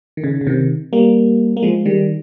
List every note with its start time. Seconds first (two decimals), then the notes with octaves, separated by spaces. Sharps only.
0.17 D#3
0.24 C#3
0.41 C#3
0.47 C3 D#3
0.93 G3 A#3
1.57 A#3
1.63 F3 G#3
1.85 D#3 G3